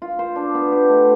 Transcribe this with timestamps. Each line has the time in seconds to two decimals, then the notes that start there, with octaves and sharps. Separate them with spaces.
0.02 F4
0.19 C5
0.36 D4
0.54 B3
0.72 G4
0.89 A3